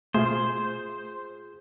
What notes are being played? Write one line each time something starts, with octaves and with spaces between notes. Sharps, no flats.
B2 A3 F4 G#4 C5